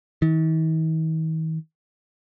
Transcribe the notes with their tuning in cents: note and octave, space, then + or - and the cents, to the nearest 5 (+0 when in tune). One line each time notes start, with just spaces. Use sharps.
D#3 +45